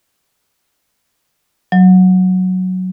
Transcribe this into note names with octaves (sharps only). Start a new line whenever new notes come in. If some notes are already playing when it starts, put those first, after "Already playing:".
F#3